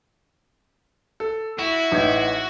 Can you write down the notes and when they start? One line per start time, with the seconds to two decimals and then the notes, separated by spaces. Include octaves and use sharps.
1.20 A4
1.59 E4 F#4 E7
1.92 A1 D#4 G#6